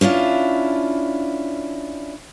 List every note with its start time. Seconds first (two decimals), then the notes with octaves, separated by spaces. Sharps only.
0.01 C#4 D4 E4 F4